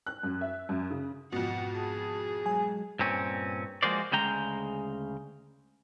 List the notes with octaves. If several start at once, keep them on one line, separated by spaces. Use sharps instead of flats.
F#6
F#2
E5
F#2
C#3
F2 G#2 B2 F#5
G#4 A5
F#3 G#3 G#5
G2 A#2 C4 C#4
F3 G#3 A#3 F#4 C5 D5
D2 C#3 G#3 G5 A#5